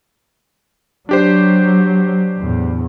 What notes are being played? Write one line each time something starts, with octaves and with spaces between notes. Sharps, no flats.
F#3 D4 G4 C5
E2 A2